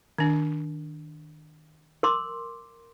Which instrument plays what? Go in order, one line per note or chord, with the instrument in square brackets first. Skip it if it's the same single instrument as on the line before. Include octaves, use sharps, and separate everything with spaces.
[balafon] D#3 D4
[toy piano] A#4 C6 D6